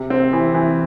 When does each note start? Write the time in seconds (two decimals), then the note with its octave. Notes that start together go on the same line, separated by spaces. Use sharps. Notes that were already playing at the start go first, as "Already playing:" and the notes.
Already playing: C3
0.10 C4
0.33 E3
0.54 E3